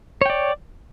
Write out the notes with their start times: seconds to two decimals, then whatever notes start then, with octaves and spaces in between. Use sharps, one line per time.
0.21 C#5
0.26 G5
0.30 D5